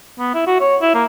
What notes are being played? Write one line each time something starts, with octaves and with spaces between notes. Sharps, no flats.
B3
E4
F#4
C#5
E4
A#3